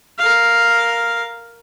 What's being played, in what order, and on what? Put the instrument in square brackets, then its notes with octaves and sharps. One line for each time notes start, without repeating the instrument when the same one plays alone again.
[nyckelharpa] A#4 F5